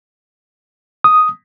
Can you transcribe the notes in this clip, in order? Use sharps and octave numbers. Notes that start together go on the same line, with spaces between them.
D#6